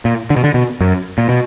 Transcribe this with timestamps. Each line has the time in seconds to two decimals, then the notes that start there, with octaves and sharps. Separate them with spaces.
0.05 A#2
0.30 D3
0.36 B2
0.44 D3
0.54 B2
0.81 F#2
1.18 A#2
1.29 B2